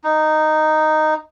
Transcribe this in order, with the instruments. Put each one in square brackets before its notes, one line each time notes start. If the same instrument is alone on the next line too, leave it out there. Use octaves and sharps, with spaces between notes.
[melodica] D#4